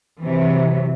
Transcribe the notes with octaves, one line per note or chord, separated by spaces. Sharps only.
C3 E3 F#3